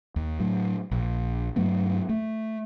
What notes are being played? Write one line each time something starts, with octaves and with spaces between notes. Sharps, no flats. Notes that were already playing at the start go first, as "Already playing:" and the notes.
D#2
A2 F#3
A#1
G2 F#3 A3 B3
A3